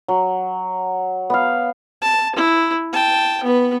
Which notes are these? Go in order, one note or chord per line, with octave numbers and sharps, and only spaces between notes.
F#3
B3 F5
A5
E4
G5 A5
B3 B4